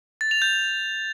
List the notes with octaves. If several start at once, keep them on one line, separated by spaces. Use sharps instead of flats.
A6
F7
G6